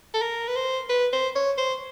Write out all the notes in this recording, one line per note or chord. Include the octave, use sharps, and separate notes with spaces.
A4
A#4
B4
C5
B4
C5
C#5
C5